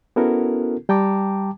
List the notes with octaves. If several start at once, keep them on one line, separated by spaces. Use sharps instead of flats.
B3 C#4 E4 F#4 A4 A#4
G3 G5 A5 A#5 D6